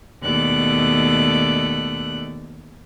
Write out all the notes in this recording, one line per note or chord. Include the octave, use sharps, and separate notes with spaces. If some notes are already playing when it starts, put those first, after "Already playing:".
D#2 B2 A3 D5 F#6